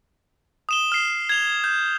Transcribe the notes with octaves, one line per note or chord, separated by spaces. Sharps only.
D#6 E7 G7
F6 C7
G#6 F7 G7
G6